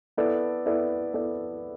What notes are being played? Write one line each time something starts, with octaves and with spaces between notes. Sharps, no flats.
B3 E4 A4 D5
B3 E4 A4 D5
B3 E4 A4 D5